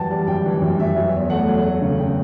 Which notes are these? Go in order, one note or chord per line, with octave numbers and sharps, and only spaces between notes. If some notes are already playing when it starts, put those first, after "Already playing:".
Already playing: F#2 E3 G3 F#5 G5 A5
G3 A5
F#2 G5
E3
F#2
F#2 E5
F#3
E2
A3 F#5
F#3
A3
C#3
C#3 G5